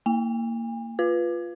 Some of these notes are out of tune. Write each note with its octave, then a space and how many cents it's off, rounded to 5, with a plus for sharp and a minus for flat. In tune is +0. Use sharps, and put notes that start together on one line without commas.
A#3 -20 G#5 -45
F4 +0 B4 +0